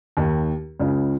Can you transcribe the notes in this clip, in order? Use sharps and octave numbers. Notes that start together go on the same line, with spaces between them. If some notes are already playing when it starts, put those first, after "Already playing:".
D#2 D#3
C#2 C#3